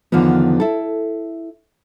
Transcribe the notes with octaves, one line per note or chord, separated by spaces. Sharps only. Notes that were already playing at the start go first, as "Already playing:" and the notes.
E2 D3 D#3 F3 B3
E4 A4